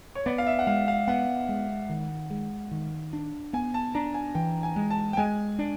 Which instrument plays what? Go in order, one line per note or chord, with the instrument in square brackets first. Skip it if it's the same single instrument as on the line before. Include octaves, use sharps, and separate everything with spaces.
[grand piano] C#5
[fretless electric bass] B3 [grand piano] D5
[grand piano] F5
E5
F#5
[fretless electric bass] G#3 [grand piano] F5
[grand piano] F5
[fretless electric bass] B3 [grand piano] F#5
[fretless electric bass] G#3
D#3
G#3
D#3
D4
[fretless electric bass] B3 [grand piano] G#5
[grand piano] A5
[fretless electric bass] D4 [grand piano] A#5
[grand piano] G#5
[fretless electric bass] E3 [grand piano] G5
[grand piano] G#5
[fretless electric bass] G#3
[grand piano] A5
G5
[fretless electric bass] G#3 [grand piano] G#5
[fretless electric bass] D4